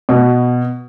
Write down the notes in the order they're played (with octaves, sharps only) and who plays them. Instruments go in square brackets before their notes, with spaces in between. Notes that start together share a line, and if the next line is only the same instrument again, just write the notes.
[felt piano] B2